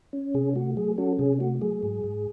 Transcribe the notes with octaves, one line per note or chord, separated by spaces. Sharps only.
C#4
C3 G#4
A3 F#4
F#3 G#4
C#4 F#4 A4
C3 G#4
A3 F#4
F#3 G#4
G#2
G#2